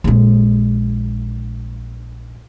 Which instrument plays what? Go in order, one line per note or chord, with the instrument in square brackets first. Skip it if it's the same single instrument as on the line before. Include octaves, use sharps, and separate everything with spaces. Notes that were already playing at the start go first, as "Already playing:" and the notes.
[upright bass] A#1 G#3